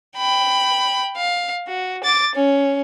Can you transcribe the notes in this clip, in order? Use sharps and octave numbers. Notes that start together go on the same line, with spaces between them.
G5 B5
F5
F#4
D6 A6
C#4